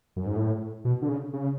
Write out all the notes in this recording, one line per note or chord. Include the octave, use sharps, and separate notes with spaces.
F#2
G#2
A2
B2
D3
C#3
C#3